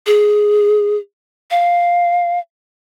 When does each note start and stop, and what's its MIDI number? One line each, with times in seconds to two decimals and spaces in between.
0.06 0.97 68
1.51 2.39 77